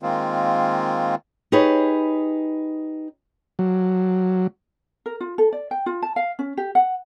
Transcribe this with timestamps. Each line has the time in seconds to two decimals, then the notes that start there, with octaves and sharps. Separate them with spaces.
0.02 D#3 G#3 A#3 C4 F4
1.52 D#4 G4 G#4 B4 C#5
3.59 F#3
5.06 A#4
5.21 F4
5.38 A4
5.53 D5
5.71 G5
5.86 F4
6.02 A5
6.16 F5
6.39 C#4
6.57 G4
6.75 F#5